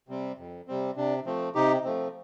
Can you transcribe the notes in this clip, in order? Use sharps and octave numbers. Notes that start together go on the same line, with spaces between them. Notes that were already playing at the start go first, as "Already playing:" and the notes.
C3 G3 C4
F2
C3 G3 C4
C3 D4
F3 A3 C4
C3 D#4 G4
F3 A3 C4